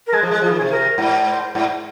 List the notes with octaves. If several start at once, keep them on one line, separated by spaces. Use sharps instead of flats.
A#4
G#3 G#4
F3
G#3
F3 F4
D#3
G#4
C3
A#4
G#2
C5
G#2